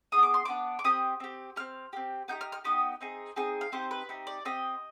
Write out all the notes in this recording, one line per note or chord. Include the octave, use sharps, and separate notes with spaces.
B3 D4 F4 G#4 D#6
D6
C6
B3 D4 F4 G#4 D6
D6
C4 G4 D#6
C4 G4
C4 G4 F6
C4 G4
B3 D#4 G4 G6
F6
F6
B3 D#4 G4 D#6
C4 D#4 G#4
C4 D#4 G#4 G#5
F5
C4 D#4 G4 C5
B4
C4 D#4 G4
D5
C4 G4 D#5